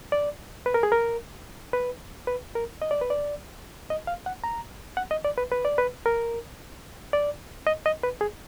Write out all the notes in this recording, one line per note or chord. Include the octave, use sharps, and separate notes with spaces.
D5
B4
A#4
G#4
A#4
B4
B4
A#4
D#5
D5
B4
D5
D#5
F5
F#5
A#5
F#5
D#5
D5
B4
B4
D5
B4
A#4
D5
D#5
D#5
B4
G#4